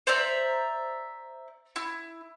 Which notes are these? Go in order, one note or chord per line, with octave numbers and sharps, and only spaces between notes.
C5 D5 E5 A#5
E4